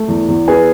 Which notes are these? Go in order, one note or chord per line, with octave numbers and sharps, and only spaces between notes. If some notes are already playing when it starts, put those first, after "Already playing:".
Already playing: A3
E2
E2
B3 G#4 G#5